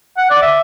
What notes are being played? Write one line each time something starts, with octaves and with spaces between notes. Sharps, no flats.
F#5
D5
E5